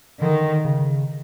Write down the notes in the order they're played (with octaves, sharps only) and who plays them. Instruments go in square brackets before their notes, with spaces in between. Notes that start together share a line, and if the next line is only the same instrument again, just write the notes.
[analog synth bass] D3 [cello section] D#3
[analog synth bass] C#3